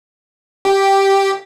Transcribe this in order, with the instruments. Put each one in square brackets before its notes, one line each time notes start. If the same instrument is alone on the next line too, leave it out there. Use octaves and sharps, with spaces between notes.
[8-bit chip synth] G4